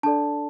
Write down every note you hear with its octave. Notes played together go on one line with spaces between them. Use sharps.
D4 A4 D5 A5